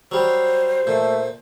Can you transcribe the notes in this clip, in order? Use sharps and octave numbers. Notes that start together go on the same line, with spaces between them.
F#3 G3 C5
A#2 A3